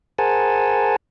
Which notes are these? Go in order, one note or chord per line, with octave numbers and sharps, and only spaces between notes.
G#4 A#4 C5 F#5 G#5 A5